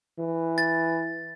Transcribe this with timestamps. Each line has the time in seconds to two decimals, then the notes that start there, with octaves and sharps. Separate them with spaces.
0.19 E3
0.58 A6